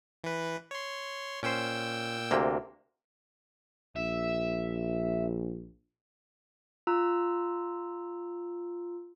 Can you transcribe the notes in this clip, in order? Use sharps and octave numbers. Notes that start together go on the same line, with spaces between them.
E3 B4
C#5 C6
A#2 C#4 C5 G5 E6
D2 C3 A#3
A#1 E5
F4 A#5 E6